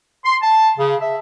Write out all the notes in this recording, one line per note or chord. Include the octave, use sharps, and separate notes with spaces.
C6
A5
C#3
E5